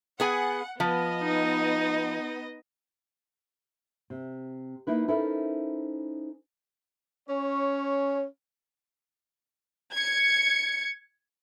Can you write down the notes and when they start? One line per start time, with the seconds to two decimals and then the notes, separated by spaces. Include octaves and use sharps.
0.20 B3 G#4 F#5 G#5
0.80 F3 B3 D#5
1.23 D#4
4.10 C3
4.87 A#3 D#4 E4 B4
5.08 C#4 D#4 E4 A4 A#4 C5
7.29 C#4 C#5
9.93 G#6 C#7